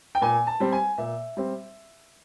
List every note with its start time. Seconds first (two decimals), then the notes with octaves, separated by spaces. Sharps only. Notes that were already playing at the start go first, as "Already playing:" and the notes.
0.15 G5
0.21 A#2 G#5
0.47 A5
0.60 G3 C4
0.72 G#5
0.98 A#2 E5
1.37 G3 C4